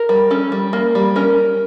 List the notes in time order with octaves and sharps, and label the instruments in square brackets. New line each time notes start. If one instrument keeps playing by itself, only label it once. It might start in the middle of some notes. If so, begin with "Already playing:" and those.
Already playing: [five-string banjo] A#4
G3
C#4 A4
G3
A#3
G3
C#4 A#4